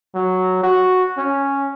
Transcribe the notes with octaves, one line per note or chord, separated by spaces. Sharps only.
F#3
F#4
C#4